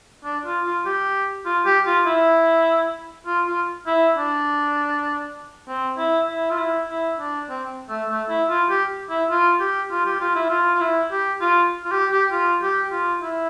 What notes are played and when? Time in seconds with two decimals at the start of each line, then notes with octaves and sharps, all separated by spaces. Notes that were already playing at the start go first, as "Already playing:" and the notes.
0.24 D4
0.46 F4
0.65 F4
0.85 G4
1.45 F4
1.65 G4
1.86 F4
2.06 E4
3.26 F4
3.47 F4
3.86 E4
4.17 D4
5.68 C4
5.98 E4
6.28 E4
6.50 F4
6.58 E4
6.89 E4
7.19 D4
7.49 C4
7.89 A3
8.09 A3
8.29 E4
8.49 F4
8.69 G4
9.10 E4
9.30 F4
9.60 G4
9.91 F4
10.05 G4
10.20 F4
10.35 E4
10.50 F4
10.75 F4
10.81 E4
11.11 G4
11.41 F4
11.84 F4
11.91 G4
12.12 G4
12.32 F4
12.62 G4
12.92 F4
13.21 E4